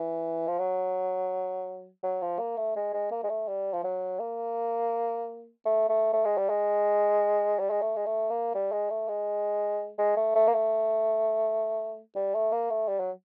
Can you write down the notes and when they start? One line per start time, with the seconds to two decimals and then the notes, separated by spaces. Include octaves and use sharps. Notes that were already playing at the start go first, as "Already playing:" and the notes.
Already playing: E3
0.47 F3
0.59 F#3
2.03 F#3
2.22 F3
2.39 A#3
2.57 A3
2.76 G#3
2.93 G#3
3.11 A#3
3.24 G#3
3.30 A3
3.48 G3
3.73 F3
3.84 F#3
4.20 A#3
5.65 A3
5.89 A3
6.13 A3
6.25 G#3
6.37 G3
6.49 G#3
7.59 G3
7.70 G#3
7.81 A3
7.96 G#3
8.06 A3
8.30 A#3
8.55 G3
8.72 G#3
8.90 A3
9.08 G#3
9.98 G#3
10.17 A3
10.35 A3
10.47 A#3
10.53 A3
12.15 G3
12.35 A3
12.52 A#3
12.70 A3
12.88 G3
13.00 F#3